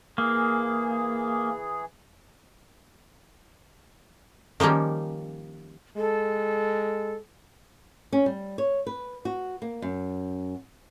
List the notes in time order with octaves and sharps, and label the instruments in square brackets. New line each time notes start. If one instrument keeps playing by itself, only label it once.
[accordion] E3 G#4 [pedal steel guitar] A#3
[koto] D#3 F3 G3 A#3 C#4
[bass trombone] G#3 [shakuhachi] A4
[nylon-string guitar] C#4
G3
C#5
B4
F#4
A#3
F#2